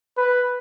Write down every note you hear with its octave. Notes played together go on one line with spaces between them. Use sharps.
B4